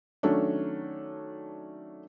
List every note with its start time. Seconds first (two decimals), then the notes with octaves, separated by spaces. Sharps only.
0.23 D#3 F#3 A3 C#4 D4